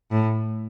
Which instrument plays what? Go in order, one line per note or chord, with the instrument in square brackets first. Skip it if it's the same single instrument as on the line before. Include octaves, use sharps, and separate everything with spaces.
[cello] A2